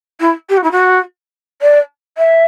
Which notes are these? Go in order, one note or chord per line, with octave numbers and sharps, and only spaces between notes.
E4
G4
F#4
E4
F#4
D5
E5